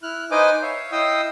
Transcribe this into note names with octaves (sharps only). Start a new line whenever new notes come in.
E4 F6 F#6
D#4 B4 C5 D#5 G#5 D6
C#5 E5 F5
E4 D#5 F5 G5 D#6 E6